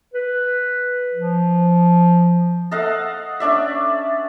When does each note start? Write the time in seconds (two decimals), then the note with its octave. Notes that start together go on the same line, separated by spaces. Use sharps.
0.14 B4
1.15 F3
2.71 A4 D#5 F5 F#5
3.40 C#4 D4 D5 E5